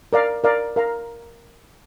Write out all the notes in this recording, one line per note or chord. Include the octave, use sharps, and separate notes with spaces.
A#4 D5 F5
A#4 D5 F5
A#4 F5 A#5